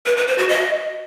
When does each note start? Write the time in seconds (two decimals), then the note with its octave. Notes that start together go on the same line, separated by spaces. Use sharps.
0.06 B4
0.17 B4
0.27 C5
0.38 F#4
0.49 D#5